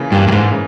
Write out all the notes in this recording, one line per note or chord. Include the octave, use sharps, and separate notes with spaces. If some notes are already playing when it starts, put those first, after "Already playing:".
Already playing: C#3 E3 A#3
G2 E3 A#3
G2
G#2
C#3